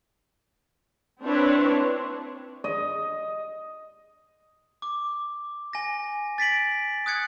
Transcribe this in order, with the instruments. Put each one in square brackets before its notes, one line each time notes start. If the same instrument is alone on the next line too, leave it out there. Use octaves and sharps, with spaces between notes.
[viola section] C4 D4 E4 B4 C#5
[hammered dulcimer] D#5
[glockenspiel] D6
G#5 A#6
A6 B6 D7 F#7
D#6 F#6 G#6 C#7